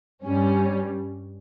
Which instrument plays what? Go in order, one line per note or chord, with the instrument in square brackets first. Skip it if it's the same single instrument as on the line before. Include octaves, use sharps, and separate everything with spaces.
[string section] G2 G3 C#4